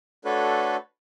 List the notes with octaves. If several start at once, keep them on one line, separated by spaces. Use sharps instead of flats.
A3 D4 F#4 A4 B4 C#5